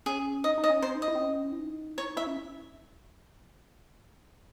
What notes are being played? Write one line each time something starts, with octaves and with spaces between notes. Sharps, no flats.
C#4 G#4
D#4 D#5
D#4
D#5
C#4
C4 C5
D#4
D#5
E4
C4
C#4
E4
D#4
E4 C#5
D#4
E4 E5
C#4